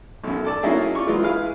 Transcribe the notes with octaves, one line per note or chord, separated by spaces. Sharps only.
B1 F#2
A4 D5 A5
F#3 A#3 C#4 D#4 E4 G#4
F4 D5 C#6
E3 F#3 G#3 F4
E4 G#4 B4 F5